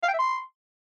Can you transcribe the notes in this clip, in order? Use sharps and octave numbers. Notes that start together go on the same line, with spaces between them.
F5
G5
E5
C6